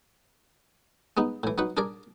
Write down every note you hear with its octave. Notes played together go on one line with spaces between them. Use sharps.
G#3 B3 D#4
A2 E3
F#3 D#4 B4 F#5
D4 G#4 A#4 D5